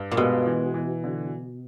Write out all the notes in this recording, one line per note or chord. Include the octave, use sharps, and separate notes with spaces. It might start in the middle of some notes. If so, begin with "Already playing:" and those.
Already playing: G2
A#2
B2 G#3
E3
E3
D3